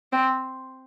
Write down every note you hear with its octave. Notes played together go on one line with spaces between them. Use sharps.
C4